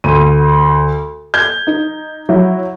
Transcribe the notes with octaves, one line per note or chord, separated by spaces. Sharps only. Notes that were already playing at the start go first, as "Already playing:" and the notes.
D2 D#7
G6 G#6
D#4
F#3 E4